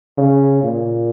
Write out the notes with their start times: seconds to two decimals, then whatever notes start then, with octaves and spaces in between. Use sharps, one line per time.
0.17 C#3
0.63 A#2